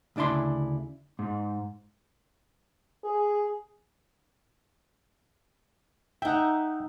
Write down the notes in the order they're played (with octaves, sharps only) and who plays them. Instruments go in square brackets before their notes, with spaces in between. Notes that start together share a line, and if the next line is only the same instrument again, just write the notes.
[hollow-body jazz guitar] D2 C#3 D4 E4 C6
[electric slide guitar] G#2
[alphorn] G#4
[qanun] D#4 E5 [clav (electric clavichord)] F#5 G5